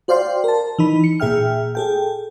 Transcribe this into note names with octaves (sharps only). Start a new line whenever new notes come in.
F#4 C5 D5 F5 G5 C6
A#4 A5
E3 D#4 B5
C#7
A#2 G#4 E5 G5 F6
G#4 A4 G5